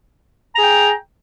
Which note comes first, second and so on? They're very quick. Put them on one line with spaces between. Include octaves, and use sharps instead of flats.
A#5 G#4 G5